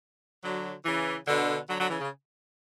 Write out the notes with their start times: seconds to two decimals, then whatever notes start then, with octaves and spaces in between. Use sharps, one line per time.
0.43 D3 F#3
0.85 C#3 E3
1.27 B2 D3
1.69 D3 F#3
1.79 D3 F#3
1.89 C#3 E3
2.00 C#3